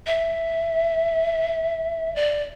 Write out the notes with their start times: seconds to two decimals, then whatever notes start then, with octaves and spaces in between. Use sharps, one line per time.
0.07 E5
2.16 D5